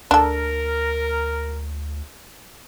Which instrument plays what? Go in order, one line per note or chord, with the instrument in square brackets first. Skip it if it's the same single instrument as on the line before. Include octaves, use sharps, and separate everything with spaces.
[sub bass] D2 [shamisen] D4 A4 [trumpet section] A#4